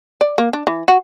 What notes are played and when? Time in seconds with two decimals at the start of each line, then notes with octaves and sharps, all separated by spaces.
0.21 D5
0.38 A#3
0.53 D4
0.67 E3
0.88 F#4